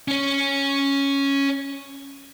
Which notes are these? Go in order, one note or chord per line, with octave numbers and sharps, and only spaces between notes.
C#4 C#5